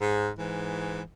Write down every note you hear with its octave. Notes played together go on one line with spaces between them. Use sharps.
G#2
G#2 E3